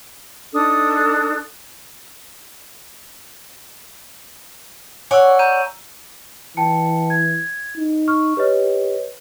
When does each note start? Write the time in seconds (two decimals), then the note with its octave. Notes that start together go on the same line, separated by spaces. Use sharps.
0.54 D4 D#4 A4 D#6
5.11 C#5 D5 F#5 G#5 C#6 E6
5.39 A#5 G6 D#7
6.57 E3 G5 A5 C#7
7.10 G#6
7.77 D#4
8.08 C#6 F6
8.37 G4 B4 C#5 D#5